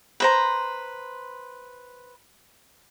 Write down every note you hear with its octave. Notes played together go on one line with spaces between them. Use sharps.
B4 C5 A#5